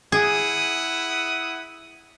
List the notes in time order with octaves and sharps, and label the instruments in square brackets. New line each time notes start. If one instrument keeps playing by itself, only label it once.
[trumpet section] E4 F#5 D#6 [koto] G#4